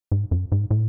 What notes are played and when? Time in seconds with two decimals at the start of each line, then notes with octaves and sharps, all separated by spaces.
0.12 G#2
0.31 F#2
0.52 G#2
0.71 A2